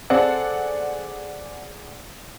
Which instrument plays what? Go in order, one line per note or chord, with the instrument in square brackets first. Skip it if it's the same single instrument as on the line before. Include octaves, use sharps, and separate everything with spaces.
[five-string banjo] C4 A4 [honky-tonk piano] G#4 D5 F#5